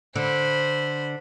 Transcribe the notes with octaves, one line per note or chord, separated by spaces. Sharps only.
D3 C5 B5